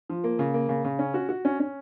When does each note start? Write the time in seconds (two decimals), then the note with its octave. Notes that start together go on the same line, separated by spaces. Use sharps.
0.09 F3
0.24 A#3
0.39 C#3
0.54 A#3
0.69 C#3
0.84 C#3
0.99 C#4
1.14 F#4
1.29 F#4
1.45 C#4
1.60 C#4